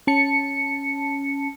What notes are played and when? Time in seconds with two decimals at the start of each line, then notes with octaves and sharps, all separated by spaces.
0.07 C#4 A5 C#7